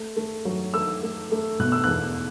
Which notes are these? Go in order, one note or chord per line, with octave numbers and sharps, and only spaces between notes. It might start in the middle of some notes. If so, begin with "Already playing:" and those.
Already playing: A3
A3
F#3
A3 E6
A3
A3
B2 F#6
E6
E2 F#6